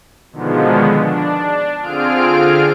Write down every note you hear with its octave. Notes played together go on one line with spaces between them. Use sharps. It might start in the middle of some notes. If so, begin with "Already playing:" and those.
B2 D3 D#3 F3 G#3 B3
D4
D3 C4 F4 G#4 F6 D7